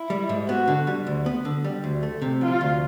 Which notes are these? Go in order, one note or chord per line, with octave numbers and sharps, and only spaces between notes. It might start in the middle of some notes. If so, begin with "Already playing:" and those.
Already playing: E4
G3
G#2
B3 F#4
D3
G3
D2
B3
D3
G3
D2
A3
C3
F3 F4
D2